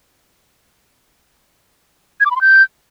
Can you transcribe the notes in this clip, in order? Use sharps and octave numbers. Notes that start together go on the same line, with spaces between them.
G#6
D6
B5
C6
G6